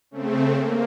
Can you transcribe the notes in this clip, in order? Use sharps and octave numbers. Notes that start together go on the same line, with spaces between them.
C#3 A3 C4
A#3